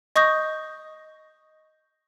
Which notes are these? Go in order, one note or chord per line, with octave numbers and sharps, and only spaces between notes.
D#5 C#6 D#6 G6 A#6